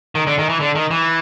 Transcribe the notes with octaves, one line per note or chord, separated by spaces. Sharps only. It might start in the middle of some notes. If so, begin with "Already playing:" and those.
D#3
D3
D#3
E3
D3
D#3
E3